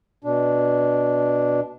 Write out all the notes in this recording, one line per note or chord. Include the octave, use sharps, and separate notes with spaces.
B2 D4